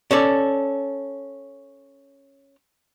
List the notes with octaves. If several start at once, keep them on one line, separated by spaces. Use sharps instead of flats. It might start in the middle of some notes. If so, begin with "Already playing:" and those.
C#4 A4 D5